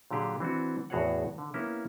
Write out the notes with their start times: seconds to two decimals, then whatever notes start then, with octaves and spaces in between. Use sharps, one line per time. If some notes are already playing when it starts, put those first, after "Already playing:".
0.11 A#2 D3 F#3 G4 G#4
0.40 E3 C4 D4 F#4
0.90 E2 A2 F#4 G#4 C#5 F#5
1.38 D3
1.54 A#3 B3 C#4 E4 G4